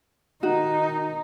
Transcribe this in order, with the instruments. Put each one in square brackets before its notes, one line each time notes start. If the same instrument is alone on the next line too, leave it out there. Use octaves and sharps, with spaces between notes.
[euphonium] D#3 [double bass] D#4 [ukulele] F#4